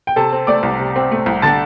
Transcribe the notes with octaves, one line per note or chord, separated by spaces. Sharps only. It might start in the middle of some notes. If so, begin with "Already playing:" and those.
G5
C3 A4 A5
C4
A3 D5 D6
C2
C3
C4
A3
C2
D3 A5 A6